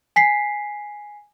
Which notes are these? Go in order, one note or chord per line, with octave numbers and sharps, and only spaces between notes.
G#5 B6 C7